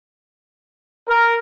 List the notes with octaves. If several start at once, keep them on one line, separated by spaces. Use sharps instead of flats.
A#4